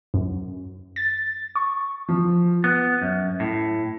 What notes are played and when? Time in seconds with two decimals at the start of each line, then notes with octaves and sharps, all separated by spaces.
0.14 F#2
0.96 A6
1.55 C#6
2.08 F3
2.64 B3
3.02 F#2
3.40 A2